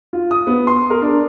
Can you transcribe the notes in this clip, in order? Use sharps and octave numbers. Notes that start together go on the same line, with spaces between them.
F4
D#6
B3
C6
A#4
D4